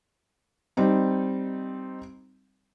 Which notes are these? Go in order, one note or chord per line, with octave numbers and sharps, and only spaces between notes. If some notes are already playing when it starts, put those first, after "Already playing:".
G3 C4 D#4